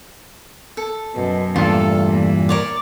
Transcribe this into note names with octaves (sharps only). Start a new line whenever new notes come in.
A4
F#2 B2
E2 G2 A#2 A3 F4 A4 F5
E3 A#3
A#4 C#5 D5